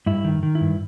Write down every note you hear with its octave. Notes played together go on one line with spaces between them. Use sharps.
G2 E4
D#3
D#3
E4
G2